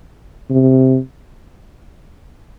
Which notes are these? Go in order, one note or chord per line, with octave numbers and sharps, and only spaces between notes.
C3